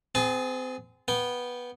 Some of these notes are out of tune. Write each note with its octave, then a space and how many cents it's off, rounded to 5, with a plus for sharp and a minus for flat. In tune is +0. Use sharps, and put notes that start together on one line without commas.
C4 -35 G#4 +0 A5 -30
B3 -10 G5 +0